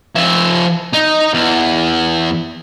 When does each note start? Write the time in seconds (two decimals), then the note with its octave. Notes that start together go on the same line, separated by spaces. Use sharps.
0.15 F3 E5
0.93 D#4
1.34 E2